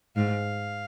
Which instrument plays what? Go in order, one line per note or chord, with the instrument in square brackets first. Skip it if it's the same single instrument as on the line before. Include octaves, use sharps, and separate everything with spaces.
[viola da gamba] G#2 [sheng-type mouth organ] F5